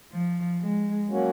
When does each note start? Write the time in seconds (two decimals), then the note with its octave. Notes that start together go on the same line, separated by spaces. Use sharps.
0.12 F3
0.61 G#3
1.08 F#3 A#3 C#4 F#4